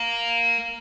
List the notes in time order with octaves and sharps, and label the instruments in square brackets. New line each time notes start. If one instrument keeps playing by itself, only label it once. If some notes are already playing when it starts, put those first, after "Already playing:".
Already playing: [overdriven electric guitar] A#3